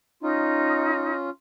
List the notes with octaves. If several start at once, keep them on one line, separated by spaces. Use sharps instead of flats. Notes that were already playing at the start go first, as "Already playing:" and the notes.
C#4 D#4 F4